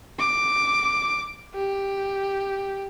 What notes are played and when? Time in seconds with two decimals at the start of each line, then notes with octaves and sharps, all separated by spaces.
0.19 D6
1.55 G4